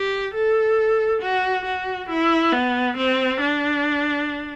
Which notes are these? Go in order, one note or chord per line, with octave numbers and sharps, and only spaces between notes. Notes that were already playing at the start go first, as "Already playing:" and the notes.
Already playing: G4
A4
F#4
F#4
E4
B3
C4
D4